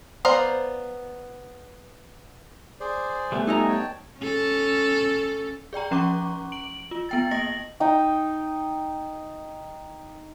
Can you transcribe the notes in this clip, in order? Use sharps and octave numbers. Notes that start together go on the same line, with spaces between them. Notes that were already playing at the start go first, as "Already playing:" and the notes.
B3 C5 D5 F5 A#5
G#4 C5 D5
G3 A3 B3
D#4 A4 D#5 G#5 A#5
C#5 G5 A5
C#4 A4
G#4 D5 G5 A#5
F3 C#4 A#5 C#6 D6
D7 F#7
F4
B3 G5 A6
A#3 D#5 A#6 F#7
D#4 G5 D#6